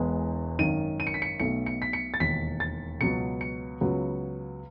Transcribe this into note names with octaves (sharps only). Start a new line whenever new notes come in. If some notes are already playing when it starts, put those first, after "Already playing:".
Already playing: E1 E2 B2 G#3 B3
G#1 F#2 D#3 D#7
D#7
C#7
B6
C#7
B1 B2 A3 C#7
C#7
B6
C#7
A6
E1 D#2 D#3 B6
A6
C#2 B2 F#3 B3 C#7
C#7
C#2 C#3 F#3 B3